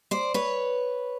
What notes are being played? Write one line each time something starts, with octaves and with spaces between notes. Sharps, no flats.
C5 D5
B4 C#5